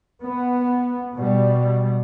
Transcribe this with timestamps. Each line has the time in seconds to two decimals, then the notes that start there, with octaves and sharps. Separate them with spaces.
0.22 B3
1.14 B2 G3